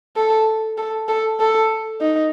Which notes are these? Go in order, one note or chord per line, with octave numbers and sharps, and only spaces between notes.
A4
A4
A4
A4
D#4